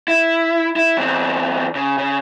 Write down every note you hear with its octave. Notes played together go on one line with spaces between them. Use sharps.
E4
E4
E2 C4
C#3
C#3